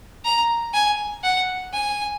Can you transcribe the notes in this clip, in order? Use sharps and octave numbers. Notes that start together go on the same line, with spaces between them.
A#5
G#5
F#5
G#5